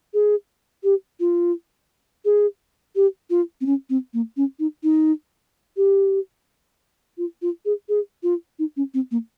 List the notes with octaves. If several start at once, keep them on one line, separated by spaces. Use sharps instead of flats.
G#4
G4
F4
G#4
G4
F4
C4
C#4
C4
A#3
C#4
D#4
D#4
G4
F4
F4
G#4
G#4
F4
D#4
C#4
C4
A#3